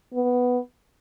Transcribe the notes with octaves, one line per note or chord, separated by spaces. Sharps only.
B3